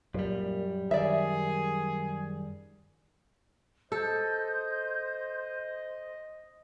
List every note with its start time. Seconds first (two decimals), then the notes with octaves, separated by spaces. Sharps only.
0.14 F#2 A#2 G3
0.91 D#3 G#4 D5 E5
3.92 A4 C5 D#5 G6